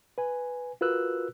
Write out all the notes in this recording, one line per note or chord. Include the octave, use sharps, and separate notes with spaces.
B4 G#5
F4 F#4 A#4 B4 E6 F#6